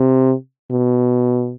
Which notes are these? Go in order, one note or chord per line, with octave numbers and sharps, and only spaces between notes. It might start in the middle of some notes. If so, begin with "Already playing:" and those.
Already playing: C3
B2